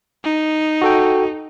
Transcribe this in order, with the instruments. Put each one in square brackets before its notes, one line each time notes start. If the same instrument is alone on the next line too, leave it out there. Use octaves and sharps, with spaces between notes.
[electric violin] D#4
[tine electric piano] F#4 A4 G5